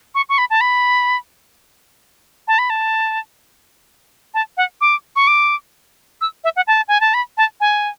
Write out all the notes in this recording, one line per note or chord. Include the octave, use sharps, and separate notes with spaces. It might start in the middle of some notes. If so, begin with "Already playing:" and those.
C#6
C#6
B5
A5
B5
A5
B5
A5
A5
F#5
D6
C#6
D6
E6
E5
F#5
A5
G#5
A5
B5
A5
G#5